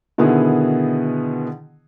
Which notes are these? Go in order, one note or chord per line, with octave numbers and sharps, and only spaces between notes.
B2 D3 D#3 B3 E4 G#4